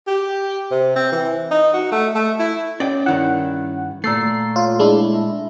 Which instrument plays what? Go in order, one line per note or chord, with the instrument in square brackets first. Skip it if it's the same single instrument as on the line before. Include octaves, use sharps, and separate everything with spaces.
[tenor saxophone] G4
C3
C4
E3
D#4
F#4
A3
A3
E4
[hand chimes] C#4 C#5 [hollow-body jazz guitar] D5 G5
[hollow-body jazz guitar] G2 D#3 E4 [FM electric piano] F#5
[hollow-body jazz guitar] A#2 A3 [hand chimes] A#5 E6 A6 [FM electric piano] C7
[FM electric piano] F4 [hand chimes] C#5
[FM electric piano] G#3 D4 E4
[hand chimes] E5